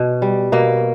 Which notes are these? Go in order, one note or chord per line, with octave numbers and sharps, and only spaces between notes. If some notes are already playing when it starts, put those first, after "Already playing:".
Already playing: B2
G3
B2 A#3